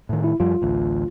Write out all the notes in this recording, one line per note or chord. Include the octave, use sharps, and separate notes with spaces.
A2 D#3
E4
F#2 F3 G3 F4
A1 D2